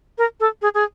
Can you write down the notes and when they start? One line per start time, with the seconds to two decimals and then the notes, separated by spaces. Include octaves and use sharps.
0.18 A#4
0.40 A4
0.62 G#4
0.74 G#4